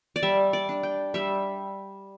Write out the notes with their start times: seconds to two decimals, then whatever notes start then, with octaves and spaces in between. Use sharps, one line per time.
0.16 D5
0.23 G3 E5
0.53 D5
0.69 D4
0.83 G5
1.14 G3 E5